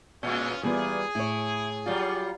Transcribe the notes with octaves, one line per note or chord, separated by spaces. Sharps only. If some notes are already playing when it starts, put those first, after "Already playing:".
A#2 G#3 C#4 F4
A#2 E3 G3 B3 F4 G#4
A2 E4 C#5
F#3 G3 F4